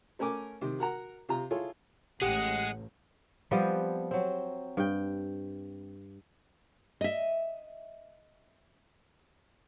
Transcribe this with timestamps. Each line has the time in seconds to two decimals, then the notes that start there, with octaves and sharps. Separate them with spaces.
0.19 A3 C#4 A#4 G#5 D6
0.61 C3 D#3
0.79 F#4 A#4 F#5 A#5
1.29 C3 F4 A#5
1.51 E4 F4 G#4 A4 C#5
2.22 A1 G#3 G4 G#4 F#5
3.51 F3 G3 B3 C4
4.11 F#3 C4
4.77 G2 G5
7.01 D#5 E5